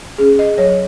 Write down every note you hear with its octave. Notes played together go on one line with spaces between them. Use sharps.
C#4 G#4
D#5
F#3 C#5